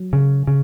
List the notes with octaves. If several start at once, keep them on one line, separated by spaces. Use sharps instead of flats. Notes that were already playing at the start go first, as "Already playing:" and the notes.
Already playing: F#3
C#3
C#3